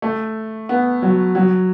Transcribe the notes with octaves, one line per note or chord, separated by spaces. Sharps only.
A3
B3
F#3
F#3